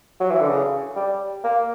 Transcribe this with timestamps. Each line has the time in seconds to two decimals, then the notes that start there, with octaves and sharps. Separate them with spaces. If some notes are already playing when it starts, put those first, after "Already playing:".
0.20 F#3
0.30 E3
0.40 D3
0.49 C#3
0.96 G3
1.44 A#3